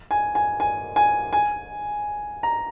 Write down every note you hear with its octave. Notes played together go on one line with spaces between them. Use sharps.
G#5
G#5
G#5
G#5
G#5
A#5